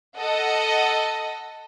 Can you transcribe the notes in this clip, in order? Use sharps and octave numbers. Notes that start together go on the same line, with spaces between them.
A4 D#5 F#5